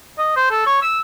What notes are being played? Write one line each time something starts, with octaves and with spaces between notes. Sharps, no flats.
D#5
C5
A4
C#5
E6